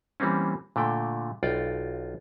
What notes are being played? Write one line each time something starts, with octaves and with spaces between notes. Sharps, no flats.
E3 G3 A#3 C4 C#4
A#2 D3 A3 G5
B1 F4 D5 G5